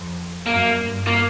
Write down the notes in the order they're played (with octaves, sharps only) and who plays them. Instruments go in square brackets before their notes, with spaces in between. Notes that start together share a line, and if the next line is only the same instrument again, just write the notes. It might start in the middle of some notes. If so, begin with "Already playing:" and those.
Already playing: [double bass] F2
[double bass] F#2 [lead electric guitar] A#3
[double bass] G2
[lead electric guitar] A#3